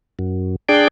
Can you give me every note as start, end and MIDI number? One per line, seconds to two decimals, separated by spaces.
0.19 0.56 42
0.69 0.88 62
0.69 0.88 68
0.69 0.88 74
0.69 0.88 79